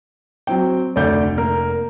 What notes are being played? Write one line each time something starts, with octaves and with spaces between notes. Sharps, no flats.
F#3 C4 G5
F1 D2 D5 G6
A#3 A#4